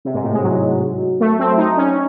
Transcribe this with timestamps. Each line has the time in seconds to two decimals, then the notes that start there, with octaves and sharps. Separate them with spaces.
0.05 C3
0.14 G#2
0.23 A2
0.33 G#3
0.43 F#3
1.20 A3
1.39 C4
1.57 D#4
1.77 C#4